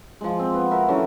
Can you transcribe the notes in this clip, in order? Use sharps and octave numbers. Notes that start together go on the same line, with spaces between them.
F3 G#3
C4
B3
F#4 A#4 E5
D3 E3 F#3 C#4